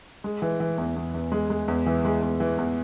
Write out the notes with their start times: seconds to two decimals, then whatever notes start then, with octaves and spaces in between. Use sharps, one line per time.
0.24 G#3
0.42 E3
0.60 E3
0.78 E2
0.96 E2
1.14 E2
1.32 G#3
1.50 G#3
1.68 E2
1.86 E3
2.05 G#3
2.22 E2
2.40 E3
2.58 E2